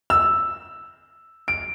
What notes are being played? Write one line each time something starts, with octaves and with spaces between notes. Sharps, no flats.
E6
D7